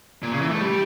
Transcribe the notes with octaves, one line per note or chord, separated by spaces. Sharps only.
A#2
C#3
E3
A3
G3